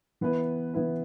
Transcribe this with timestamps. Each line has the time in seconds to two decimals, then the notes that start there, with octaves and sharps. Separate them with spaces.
0.21 E3 B3 E4 B4
0.74 E3 B3 E4 B4